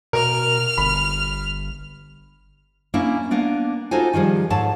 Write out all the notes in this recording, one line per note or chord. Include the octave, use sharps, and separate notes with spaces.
B2 A#4 F6
G1 B5
A#3 C#4 D4 E4
A#3 B3 D4
D#4 F4 F#4 A4 C5 G#5
D#3 F3 G3 G#4
G#2 A4 C#5 A5